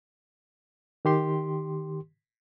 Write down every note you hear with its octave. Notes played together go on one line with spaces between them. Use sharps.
D#3 G4 C6